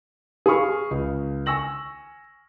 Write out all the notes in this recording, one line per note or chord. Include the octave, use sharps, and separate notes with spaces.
G#4 F5 G#5 B5 C#6 F6
C#2
G#5 C#6 E6 A#6 F#7